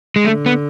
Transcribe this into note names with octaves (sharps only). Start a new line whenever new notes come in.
G#3
D3 A3
B3